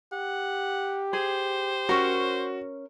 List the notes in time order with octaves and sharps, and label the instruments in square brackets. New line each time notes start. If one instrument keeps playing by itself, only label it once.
[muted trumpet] G4 [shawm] F#5
[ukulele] G#4 [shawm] C5
[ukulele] C#4 A#4 [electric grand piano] F#4